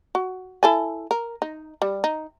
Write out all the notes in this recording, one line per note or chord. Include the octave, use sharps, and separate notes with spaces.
F#4
E4 A4 G#5
A#4
D#4
G3
D#4